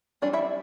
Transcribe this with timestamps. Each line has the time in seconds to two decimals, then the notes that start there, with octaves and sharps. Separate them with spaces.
0.22 E3 G3 C4 D4 D5
0.33 E4 E5